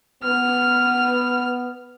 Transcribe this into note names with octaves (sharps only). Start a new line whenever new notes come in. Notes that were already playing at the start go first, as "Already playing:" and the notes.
B3 F6